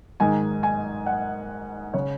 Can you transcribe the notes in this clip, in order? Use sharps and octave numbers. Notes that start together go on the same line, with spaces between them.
G#2 D#3 G#3 D#4 G#5
G#5
F#5
C#3 C#5